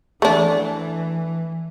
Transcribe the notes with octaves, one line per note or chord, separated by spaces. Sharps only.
E3 A3 D4